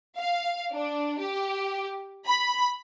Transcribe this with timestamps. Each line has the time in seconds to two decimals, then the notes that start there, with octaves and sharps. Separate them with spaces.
0.17 F5
0.73 D4
1.20 G4
2.26 B5